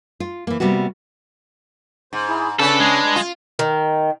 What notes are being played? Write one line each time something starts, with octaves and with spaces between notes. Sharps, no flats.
F4
E3 A#3
C3 G3 A#3 B3 F#4
G#2 C5
E4 G#4
C#3 C#4 D4 A4 B4
G#3
F4
D#3